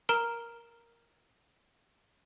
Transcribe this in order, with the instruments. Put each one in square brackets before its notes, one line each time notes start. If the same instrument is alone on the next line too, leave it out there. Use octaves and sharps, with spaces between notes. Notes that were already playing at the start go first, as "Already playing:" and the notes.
[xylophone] A#4 A#5 F6 D7 E7 G7